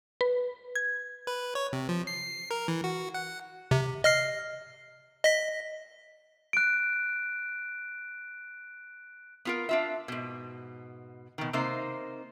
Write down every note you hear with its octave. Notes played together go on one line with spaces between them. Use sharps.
B4
G#6
B4
C#5
C3
F3
C7
A#4
E3
F#4
F#5
C3
D#5 F6 C7
D#5 B6
F#6 D7
B3 F4 A#4
D4 F4 E5
G#2 B2
B2 D#3
C3 A#3 D#4 C5